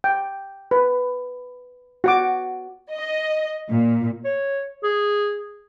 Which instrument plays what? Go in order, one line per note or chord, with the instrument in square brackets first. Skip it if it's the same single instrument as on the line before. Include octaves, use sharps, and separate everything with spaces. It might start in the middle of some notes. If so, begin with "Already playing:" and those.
[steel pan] G5
B4
F#4 F#5 D6
[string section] D#5
A#2
[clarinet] C#5
G#4